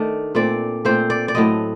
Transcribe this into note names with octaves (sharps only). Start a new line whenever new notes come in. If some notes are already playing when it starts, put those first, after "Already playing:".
Already playing: D#3 A3 D4
A#2 A3 C4 D5
A#2 A3 C4 C5
D5
D5
A2 F#3 A3 C4 D#5